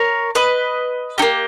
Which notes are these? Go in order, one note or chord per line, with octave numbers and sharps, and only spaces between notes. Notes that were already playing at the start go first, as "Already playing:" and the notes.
Already playing: A#4 C#5
B4 D#5
A#3 D#4 G4